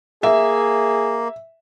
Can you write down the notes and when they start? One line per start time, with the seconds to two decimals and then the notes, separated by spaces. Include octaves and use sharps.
0.23 A#3 G#4 E5